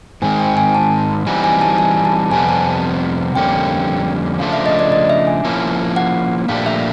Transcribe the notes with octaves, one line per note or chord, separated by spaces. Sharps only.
G#2 D#3 G#3 C4 G#5
G5
G#5
A5
E3 G3 C4 D#4 F#4 G#5
G#5
A5
G#5
A5
F2 C3 G3 B3 G#5
A5
F2 D3 G3 A#3 C#4 G5
C#3 F3 A3 D4 F5
E5
D#5
D5
D#5
E5
G#5
F3 A#3 C#4 E4
F#5
A#2 F3 A3 D4 G4 F5
E5